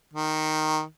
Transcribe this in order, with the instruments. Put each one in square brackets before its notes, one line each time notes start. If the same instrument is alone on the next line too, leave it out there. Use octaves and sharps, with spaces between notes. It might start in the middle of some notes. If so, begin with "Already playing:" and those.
[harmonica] D#3